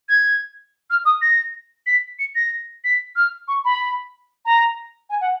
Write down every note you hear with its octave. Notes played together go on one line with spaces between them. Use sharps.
G#6
F6
D#6
A#6
B6
C#7
A#6
B6
F6
C#6
B5
A#5
G#5
F#5